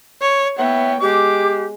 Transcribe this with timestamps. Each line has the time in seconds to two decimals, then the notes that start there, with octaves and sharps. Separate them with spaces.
0.22 C#5
0.59 B3 C#5 E5 G5
1.01 G#3 G4 D6